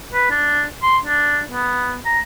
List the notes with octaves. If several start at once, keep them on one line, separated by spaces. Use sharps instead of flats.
B4
D4
C6
D4
B3
A#5